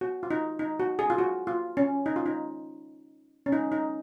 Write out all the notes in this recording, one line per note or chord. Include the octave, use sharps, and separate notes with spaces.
F#4
F4
D#4
D#4
F#4
G#4
F4
F#4
F4
C#4
D#4
F4
D#4
C#4
D#4
D#4